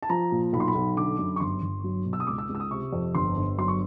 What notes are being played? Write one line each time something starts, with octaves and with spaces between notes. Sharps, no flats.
A5
F3 A#5
A#2
B1 B5
C6
B5
B1
D3 D6
F#2
C#6
G1 C6
G1
F#3
B2
E6
D#6
C#2 D6
E6
C#2
E6
D#6
C3 C#6
F2
G1 C6
G1
F#3 C6
C#6